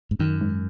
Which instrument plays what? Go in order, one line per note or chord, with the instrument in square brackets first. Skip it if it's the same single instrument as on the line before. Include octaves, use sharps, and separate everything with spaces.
[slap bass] G#2
[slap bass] F#2 [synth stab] D#3
[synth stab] G#2